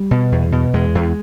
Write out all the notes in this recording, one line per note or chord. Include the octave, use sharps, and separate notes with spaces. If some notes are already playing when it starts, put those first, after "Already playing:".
Already playing: G3
B2
E2
B2
E2 G#3
E2